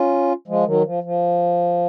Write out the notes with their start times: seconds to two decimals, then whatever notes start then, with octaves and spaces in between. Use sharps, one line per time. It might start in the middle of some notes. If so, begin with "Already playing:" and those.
Already playing: C#4 F4
0.48 F3 G#3
0.66 D#3 F#3
0.85 F3
1.04 F3